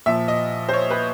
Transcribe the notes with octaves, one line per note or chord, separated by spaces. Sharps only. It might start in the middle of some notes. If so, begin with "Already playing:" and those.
A#2 F3 E5
D#5
C5
C#5
B4